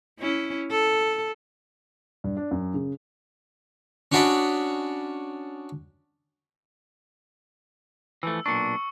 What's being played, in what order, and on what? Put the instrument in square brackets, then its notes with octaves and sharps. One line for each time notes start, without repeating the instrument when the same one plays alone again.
[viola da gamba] C#4 E4
A4
[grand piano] G2
D4
F#2
C#3
[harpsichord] C#4 D4 F#4 D5 D#5 B5
[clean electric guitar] E3 F3 A3 [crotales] E6
[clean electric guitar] B1 A#2 D4 [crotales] C#6 C#7